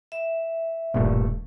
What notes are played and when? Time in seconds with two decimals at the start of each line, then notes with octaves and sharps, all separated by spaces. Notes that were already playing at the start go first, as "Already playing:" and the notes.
0.12 E5
0.94 D#1 B1 G2 A#2 A3